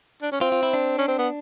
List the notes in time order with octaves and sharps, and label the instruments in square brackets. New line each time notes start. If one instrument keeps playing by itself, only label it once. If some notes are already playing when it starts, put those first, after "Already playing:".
[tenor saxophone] D4
C#4
[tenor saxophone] C4 [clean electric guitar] F4
[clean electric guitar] F4
E4
D4
[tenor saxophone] C#4
C4
B3